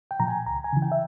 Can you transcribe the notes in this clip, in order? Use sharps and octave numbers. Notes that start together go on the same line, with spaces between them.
G5
A#2 F3 A#5
G#5
C#2 A#5
G#5
C#3 E3
G5
E5